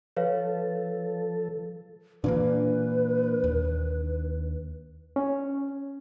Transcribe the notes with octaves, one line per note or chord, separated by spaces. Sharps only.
F3 A4 B4 C#5 F5
A#2 E3 A#3 D4 B4
D#2
C#4